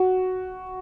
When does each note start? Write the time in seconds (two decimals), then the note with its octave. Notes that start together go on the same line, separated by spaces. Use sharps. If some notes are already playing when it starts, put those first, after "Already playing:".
Already playing: F#4